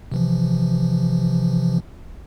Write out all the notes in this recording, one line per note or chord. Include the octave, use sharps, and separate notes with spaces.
C3 E3 F3